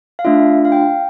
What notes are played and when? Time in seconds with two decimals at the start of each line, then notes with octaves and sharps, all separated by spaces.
0.19 F5
0.25 A3 D4 F4 E5
0.65 F5
0.72 G5